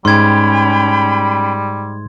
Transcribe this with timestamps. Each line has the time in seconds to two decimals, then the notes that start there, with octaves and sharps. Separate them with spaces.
0.05 G#2 G3 C#4 G5 B5 C6 G#6